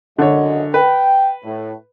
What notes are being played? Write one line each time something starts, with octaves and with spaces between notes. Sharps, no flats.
C#2 F#2 D3 C#5 D#5
B4 G5
A2